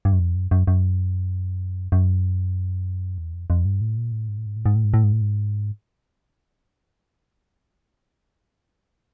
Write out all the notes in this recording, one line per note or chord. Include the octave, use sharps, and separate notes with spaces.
G2
F#2
F2
F#2
F#2
F#2
F#2
E2
F2
F2
G2
A2
A#2
A2
G#2
A2
G#2
A2
G#2
A2
G#2
A2
G#2
A2
G#2